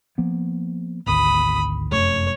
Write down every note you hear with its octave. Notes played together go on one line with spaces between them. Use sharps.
F3 A#3 B3
G#1 D2 B5 D#6
F1 F#2 A3 C#5